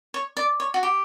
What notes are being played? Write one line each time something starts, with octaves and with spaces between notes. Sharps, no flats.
C#5
D5
C#5
F#4
G4